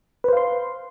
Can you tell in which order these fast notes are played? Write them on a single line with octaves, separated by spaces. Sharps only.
B4 C5 F5 C6